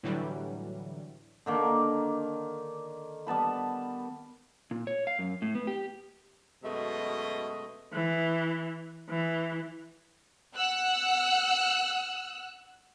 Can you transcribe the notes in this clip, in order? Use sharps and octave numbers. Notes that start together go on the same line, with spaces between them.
A2 D3 E3 F#3 G3
D3 D#3 A#3
G3 B3 A5 B5
A#2
C#5
F5
F#2
A2
B3
G4
F#2 B2 G#3 A3 D#5
E3
E3
F#5 E6 F#6